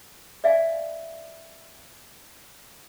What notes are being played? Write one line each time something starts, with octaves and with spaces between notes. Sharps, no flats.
D5 E5 F5 G#5